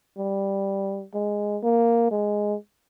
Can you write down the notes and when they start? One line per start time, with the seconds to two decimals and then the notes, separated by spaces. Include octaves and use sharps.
0.17 G3
1.14 G#3
1.63 A#3
2.11 G#3